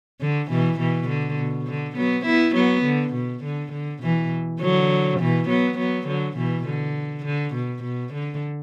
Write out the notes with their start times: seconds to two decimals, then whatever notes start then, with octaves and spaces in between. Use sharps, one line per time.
0.21 D3
0.49 B2 E3
0.79 B2 E3
1.09 D3
1.38 B2
1.67 D3
1.96 F#3 B3
2.25 B3 E4
2.55 F#3 B3
2.85 D3
3.14 B2
3.44 D3
3.72 D3
4.03 B2 E3
4.60 D3 F#3
5.20 B2 E3
5.49 F#3 B3
5.78 F#3 B3
6.07 D3 F#3
6.37 B2 E3
6.66 D3
7.25 D3
7.54 B2
7.83 B2
8.13 D3